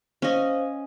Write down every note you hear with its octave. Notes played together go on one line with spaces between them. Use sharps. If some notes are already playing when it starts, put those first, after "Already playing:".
C#4 C5 C#5 D#5 F5 G#5